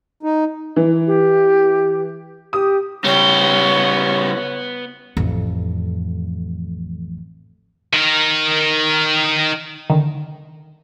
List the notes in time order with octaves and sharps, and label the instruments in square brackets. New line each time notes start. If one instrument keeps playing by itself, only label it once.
[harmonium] D#4
[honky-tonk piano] E3
[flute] G4
[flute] G4 [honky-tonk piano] D#6
[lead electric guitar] C#3 G3 [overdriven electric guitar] B3 G5 [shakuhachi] C#5
[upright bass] A1 F2
[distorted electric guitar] D#3 A#4
[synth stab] D3 D#3